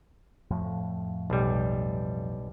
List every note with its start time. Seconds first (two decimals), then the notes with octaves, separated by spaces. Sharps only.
0.51 F2 A2 F3
1.30 B1 G3